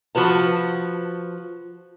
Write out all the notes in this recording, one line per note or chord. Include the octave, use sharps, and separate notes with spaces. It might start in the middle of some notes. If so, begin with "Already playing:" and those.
F3 F#4 B4 A5